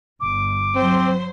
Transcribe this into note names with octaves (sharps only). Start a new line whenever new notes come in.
G1 D6
F#3 C4 C5